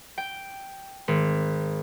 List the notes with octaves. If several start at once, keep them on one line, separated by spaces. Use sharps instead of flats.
G5
G#1